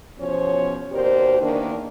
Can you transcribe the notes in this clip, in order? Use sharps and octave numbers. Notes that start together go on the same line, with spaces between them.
E2 B2 F3 C#4 C5 C#5
D#2 B2 G4 A#4 C5 D5
E2 D#3 A#3 D4